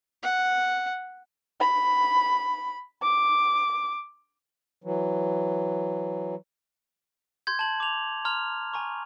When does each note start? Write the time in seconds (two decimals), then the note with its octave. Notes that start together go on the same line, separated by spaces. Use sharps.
0.23 F#5
1.60 B5
3.02 D6
4.84 E3 F#3
7.47 C6 G6 G#6
7.59 A5 F#7
7.80 D6 F7
8.25 A#5 C6 F6 F7
8.73 G#5 A#5 C#6